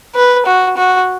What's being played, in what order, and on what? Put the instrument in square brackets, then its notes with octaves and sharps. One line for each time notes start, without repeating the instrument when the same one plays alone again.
[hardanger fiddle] B4
F#4
F#4